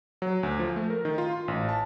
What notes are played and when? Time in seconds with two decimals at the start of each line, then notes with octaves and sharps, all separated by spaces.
0.22 F#3
0.43 D2
0.59 F3
0.76 A3
0.90 A#4
1.05 D#3
1.18 F4
1.33 C6
1.48 A1
1.69 A5